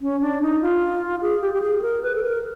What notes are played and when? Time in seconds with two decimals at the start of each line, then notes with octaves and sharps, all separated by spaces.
0.01 C#4
0.21 D4
0.42 D#4
0.62 F4
1.22 G#4
1.41 G4
1.54 G4
1.62 G#4
1.82 A#4
2.03 B4
2.16 A4
2.22 A#4